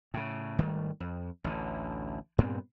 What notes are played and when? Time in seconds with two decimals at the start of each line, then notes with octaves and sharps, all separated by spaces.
0.14 A2 C#3
0.59 G#1 D#3 G3 A3
1.00 F2
1.44 A1 D2 D3
2.38 G2 A#2 B3 C4